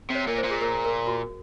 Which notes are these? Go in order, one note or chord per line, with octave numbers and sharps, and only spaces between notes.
C3
C#5
A#2 A#4
C5
A#2
G#4
A#4
A#4
F#4